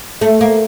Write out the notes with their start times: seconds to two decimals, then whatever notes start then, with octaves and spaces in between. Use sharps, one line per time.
0.21 A3
0.41 A#3